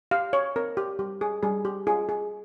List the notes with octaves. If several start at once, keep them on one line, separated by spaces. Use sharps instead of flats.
G4 F5
C#5
C4 A#4
G4
G3 G4
G#4
G3 G#4
G4
F4 G#4
G#4